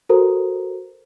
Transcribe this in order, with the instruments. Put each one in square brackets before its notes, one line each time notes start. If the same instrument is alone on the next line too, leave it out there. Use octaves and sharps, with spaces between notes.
[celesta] F#4 A4 A#4 C5 A#5